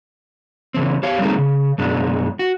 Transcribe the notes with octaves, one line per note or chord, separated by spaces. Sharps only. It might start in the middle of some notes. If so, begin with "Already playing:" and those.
C#3 E3 C4
G4 C#5 F5
G3 A3 A#3 C4 D#4 G#4
C#3
F#2 B2 G#3 D4
F#4